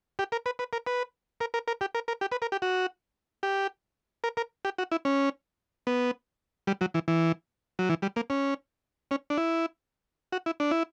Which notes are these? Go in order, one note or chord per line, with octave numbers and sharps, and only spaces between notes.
G4
A#4
B4
B4
A#4
B4
A#4
A#4
A#4
G4
A#4
A#4
G4
B4
A#4
G4
F#4
G4
A#4
A#4
G4
F#4
E4
C#4
B3
G3
F#3
E3
E3
F#3
E3
G3
A#3
C#4
C#4
D4
E4
F#4
E4
D4
E4